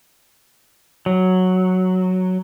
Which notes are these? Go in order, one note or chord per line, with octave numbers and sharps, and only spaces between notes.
F#3